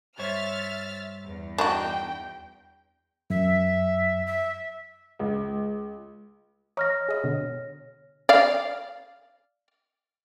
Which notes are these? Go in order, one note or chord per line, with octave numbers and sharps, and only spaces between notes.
G2 C5 C#5 E5 F6 A6
E2
D4 D#4 F#4 G5
F#2 E5
E5
C#2
C#5 D#5 A#5 C#6 F6 A#6
G#4 D#5 B5
B2 D3
D5 F5